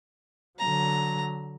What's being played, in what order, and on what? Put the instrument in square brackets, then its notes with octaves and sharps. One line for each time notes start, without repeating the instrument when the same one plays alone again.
[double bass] D3 F#3 [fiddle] A#5